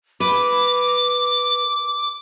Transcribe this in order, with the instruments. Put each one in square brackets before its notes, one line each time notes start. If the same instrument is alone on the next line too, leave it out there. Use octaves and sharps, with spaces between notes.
[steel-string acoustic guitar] B4 [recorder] D6